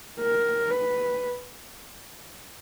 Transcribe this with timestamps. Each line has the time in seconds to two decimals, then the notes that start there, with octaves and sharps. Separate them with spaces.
0.21 A#4
0.71 B4